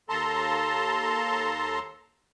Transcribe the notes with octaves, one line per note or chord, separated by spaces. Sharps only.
D#2 A4 A5 A#5 C6